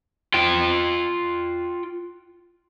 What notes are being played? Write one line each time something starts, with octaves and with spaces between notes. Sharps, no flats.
F4 G5